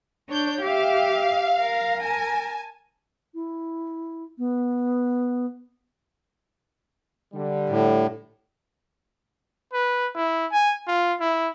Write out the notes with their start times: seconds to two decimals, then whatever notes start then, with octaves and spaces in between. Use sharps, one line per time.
0.29 D4 C#5 G6
0.62 G4 E5 F5
1.60 A#4
2.01 G#5 A5
3.35 E4
4.38 B3
7.33 D3 G3
7.69 A2
9.73 B4
10.15 E4
10.52 G#5
10.88 F4
11.20 E4